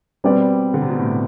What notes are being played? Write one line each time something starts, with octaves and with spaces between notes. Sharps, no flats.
B2 G3 C4 G4 B4 D5
D3
C3
B2
A2